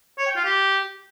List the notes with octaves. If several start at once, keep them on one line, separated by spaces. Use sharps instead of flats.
C#5
G5
F4
G4